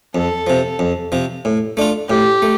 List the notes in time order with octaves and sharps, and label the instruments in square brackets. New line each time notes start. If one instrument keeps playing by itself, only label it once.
[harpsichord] F2 [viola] A4
[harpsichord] C3 F3
F2
C3 F3
A2
A3 D4 F4
[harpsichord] A2 [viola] G4
[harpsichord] A3